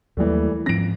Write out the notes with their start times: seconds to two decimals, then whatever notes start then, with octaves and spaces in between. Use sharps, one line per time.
0.17 D#2 E3 F#3 G3 A3 A#3
0.66 G#2 F3 C4 A#6 D7